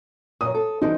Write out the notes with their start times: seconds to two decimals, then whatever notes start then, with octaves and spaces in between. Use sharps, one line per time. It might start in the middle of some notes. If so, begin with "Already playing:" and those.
0.41 A#2 F#3 D#6
0.55 A4
0.82 E3 G3 D#4 C5